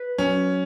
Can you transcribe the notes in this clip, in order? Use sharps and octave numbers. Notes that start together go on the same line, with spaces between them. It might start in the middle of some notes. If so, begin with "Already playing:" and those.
Already playing: B4
F#3 C#4